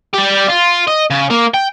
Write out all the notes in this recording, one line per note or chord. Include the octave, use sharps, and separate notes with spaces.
G3 G4
F4
D#5
C#3
A#3
G5